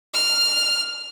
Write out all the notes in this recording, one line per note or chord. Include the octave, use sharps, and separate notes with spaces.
F6